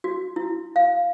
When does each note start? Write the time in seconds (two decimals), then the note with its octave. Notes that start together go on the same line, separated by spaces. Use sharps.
0.04 F#4
0.36 E4
0.76 F5